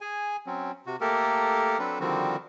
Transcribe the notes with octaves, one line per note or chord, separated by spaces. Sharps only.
G#4 G#5
F#3 C4 C#4
C3 F#4
A3 A#3 G4 A4 A#4
F#3 C4 D4 A4 B4
D3 D#3 F3 G3 C4 F#4